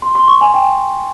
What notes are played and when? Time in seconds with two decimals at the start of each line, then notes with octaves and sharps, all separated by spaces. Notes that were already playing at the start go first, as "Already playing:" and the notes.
0.02 C6
0.15 C6
0.28 C#6
0.41 G#5
0.54 G5